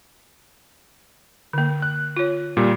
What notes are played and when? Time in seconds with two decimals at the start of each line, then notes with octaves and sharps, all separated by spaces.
1.53 D3 A#3
1.82 F#6
2.17 F4 C#5
2.57 A#2 G3